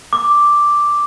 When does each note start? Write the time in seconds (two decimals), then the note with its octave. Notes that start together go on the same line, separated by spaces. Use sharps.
0.13 D6